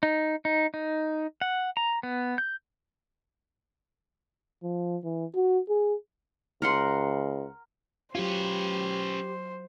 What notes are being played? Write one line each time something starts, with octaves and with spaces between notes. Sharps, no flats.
D#4
D#4
D#4
F#5
A#5
B3
G6
F3
E3
F#4
G#4
C#2 A#4 F#5 C6
F#3 C#4 F4 G4 B4 C5